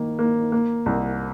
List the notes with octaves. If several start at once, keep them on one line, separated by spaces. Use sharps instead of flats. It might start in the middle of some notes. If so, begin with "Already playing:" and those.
Already playing: D#3 A#3
A#3
A#3
C2